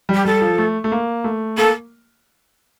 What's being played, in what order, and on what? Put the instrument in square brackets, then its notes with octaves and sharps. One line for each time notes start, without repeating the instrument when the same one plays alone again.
[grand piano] G3
[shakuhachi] G4
[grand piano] G3 [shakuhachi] A4
[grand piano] F3
A3
A3
A#3
A3
[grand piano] A#3 [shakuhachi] A4